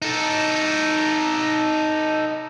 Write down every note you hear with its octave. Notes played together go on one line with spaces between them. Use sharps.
D#4 A4